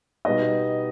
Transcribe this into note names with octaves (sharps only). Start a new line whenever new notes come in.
B2 G3 B3 D#4 D#5